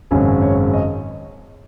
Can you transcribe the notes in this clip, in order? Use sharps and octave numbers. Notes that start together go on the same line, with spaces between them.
G#1 F#2 C#3 G#3 C#4 G#5
C#5
D#5